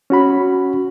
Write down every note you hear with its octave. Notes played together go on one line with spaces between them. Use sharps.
C#4 F#4 B5